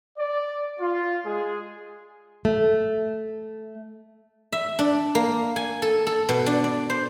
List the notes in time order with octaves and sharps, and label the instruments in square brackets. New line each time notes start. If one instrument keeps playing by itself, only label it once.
[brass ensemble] D5
F4
G#3 G#4
[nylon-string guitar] A3
[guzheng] E5
D4
A#3
G#5
A4
A4
B2
D4
D5
C5